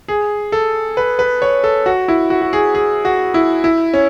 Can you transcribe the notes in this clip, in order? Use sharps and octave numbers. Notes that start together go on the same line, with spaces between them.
G#4
A4
B4
B4
C#5
A4
F#4
E4
F#4
F#4
G#4
G#4
F#4
E4
E4
C#4